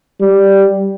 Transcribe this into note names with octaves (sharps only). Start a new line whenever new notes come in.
G3